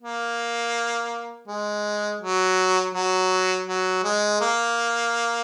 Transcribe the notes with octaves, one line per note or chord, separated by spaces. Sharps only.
A#3
G#3
F#3
F#3
F#3
G#3
A#3